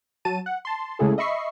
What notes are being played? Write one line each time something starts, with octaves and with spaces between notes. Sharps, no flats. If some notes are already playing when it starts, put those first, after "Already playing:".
F#3 A5 D#7
F#5
A5 C6
C#3 G#3 A3 E4 G#4 A4
D#5 E5 B5 C#6 C7